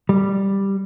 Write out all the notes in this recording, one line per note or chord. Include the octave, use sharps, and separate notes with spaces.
G3